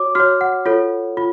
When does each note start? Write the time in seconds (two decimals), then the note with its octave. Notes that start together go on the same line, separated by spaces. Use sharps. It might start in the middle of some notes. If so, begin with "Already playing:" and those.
Already playing: F#4 C#5 D6
0.15 F#4 C#5 F6
0.41 F#5
0.66 F4 A4 C#5
1.17 F4